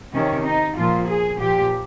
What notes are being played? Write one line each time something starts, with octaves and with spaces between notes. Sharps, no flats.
C3 D#3 C#4
D#4
A#2 F3 F4
G#4
A#2 F3 G4